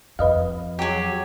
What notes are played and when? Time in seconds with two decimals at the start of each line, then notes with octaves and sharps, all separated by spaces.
0.19 F2 B4 D#5 F5
0.79 F#3 G4 G#4